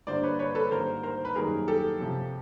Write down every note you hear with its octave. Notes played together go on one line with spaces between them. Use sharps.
G2 D3 G3 A#3 C5 D5
B4 C#5
B4 C#5
A4 B4
G#2 D#3 G3 A#3 A#4 C5
A#4 C5
B4
F#2 D#3 G3 A#3 G#4 A#4
G4 A4
F2 C3 F3